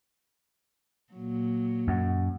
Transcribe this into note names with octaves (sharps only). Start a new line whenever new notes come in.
A#2 F#3
F#2